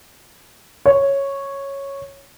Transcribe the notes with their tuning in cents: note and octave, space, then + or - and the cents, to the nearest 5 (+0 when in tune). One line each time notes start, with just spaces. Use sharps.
C#5 -5